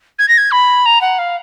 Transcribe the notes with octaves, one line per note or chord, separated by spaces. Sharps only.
G#6
A#6
G#6
B5
A#5
F#5
F5